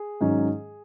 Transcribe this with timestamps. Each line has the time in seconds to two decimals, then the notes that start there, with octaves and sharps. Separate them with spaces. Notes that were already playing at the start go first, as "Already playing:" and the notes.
Already playing: G#4
0.21 G#2 D#3 F#3 C#4